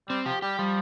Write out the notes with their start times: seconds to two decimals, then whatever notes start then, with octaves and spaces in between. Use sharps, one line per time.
0.09 G3 C4
0.26 F3 G4
0.42 G3 G4
0.58 F3 G3